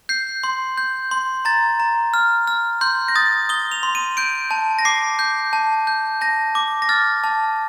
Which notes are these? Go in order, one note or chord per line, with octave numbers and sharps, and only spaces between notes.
G6 C7
C6
G6
C6
A#5 A6
A#5
F6
F6
C6 G6
A#6
D#6 A6
D#6 G7
F7
C6
D#7
G6 D7
A5
A#6
D6 C7
G6
A5
G6
A5 A#6
D6
A#6
F6 A6
A5